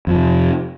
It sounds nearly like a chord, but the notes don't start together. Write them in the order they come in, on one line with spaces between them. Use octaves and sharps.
F2 F3 C3